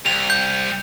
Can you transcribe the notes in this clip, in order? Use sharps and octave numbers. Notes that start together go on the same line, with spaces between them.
C2 F7
G6